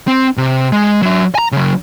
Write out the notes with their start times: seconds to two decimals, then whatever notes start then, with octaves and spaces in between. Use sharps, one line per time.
0.07 C4
0.37 C3
0.72 G#3
1.02 F#3 E5
1.35 G#5 A#5
1.52 C#3 F#3